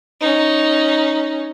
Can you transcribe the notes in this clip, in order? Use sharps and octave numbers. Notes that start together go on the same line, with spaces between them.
C#4 D#4